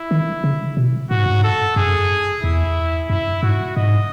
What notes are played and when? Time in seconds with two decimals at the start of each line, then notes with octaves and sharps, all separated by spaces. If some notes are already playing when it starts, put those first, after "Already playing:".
Already playing: E4
0.11 D#3
0.44 C#3
0.77 B2
1.11 A2 F#4
1.17 G#2
1.26 F#2
1.33 G#2
1.44 A4
1.76 F#2 G#4
2.43 E2 E4
3.10 F#2 E4
3.43 G#2 F#4
3.76 G#2 D#5